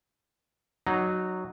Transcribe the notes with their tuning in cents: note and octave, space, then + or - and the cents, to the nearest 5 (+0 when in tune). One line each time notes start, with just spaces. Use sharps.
F#3 +0 D#4 -20